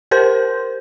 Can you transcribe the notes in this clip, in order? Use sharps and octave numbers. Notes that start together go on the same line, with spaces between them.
G4 A#4 C5 C6 G6